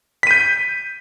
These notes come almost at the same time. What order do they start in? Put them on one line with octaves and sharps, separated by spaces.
B6 D#7 G6